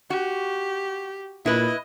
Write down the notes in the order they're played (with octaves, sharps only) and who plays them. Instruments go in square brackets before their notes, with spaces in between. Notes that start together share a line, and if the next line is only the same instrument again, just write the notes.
[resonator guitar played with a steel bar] F#4 [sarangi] G4
[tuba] A#2 [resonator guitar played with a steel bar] E4 B4 [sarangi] D#5